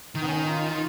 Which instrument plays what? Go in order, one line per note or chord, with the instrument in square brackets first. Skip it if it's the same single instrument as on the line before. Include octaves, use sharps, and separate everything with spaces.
[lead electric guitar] D#3 [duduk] D#4
[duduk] B3
C#4
D#4
F4